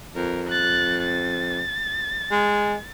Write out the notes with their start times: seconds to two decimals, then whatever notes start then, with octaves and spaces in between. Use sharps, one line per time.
0.16 F2 A#4
0.49 F#6 A6
1.02 A6
2.31 G#3